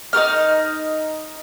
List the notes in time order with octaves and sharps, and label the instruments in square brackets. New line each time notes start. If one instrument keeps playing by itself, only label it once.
[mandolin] D#4 F#4 A#4 F6